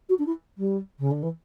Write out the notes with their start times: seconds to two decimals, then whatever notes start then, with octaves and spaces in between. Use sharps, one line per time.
0.09 F#4
0.18 D4
0.26 E4
0.57 G3
0.99 C#3
1.11 D3
1.22 E3